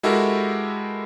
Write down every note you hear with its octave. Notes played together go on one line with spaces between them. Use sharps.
G#3 E4 F#4 G4 A4 A#4